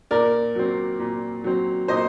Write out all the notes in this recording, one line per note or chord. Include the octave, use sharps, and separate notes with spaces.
A#2 A#4 D5
F#3 C4
A#2
F#3 C4
A#2 C5 D#5